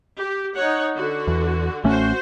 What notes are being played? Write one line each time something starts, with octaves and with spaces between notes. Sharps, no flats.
G4
D#4 C#5 F#5
D3 F#4
E2
A1 A3 C#4 F#4 C5